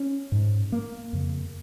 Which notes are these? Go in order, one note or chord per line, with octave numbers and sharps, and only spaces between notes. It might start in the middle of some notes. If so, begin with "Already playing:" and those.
Already playing: C#4
G#2
A#3
F2 C#3